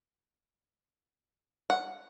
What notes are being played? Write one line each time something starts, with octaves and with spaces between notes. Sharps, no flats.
F#5